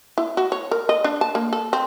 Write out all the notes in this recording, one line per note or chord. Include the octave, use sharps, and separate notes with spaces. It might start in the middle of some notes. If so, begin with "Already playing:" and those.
E4
F#4
C#5
A#4
D#5
D4
A5
A#3
A4
C4